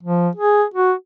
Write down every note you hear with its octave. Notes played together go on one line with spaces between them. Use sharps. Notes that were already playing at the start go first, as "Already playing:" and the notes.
F3
G#4
F#4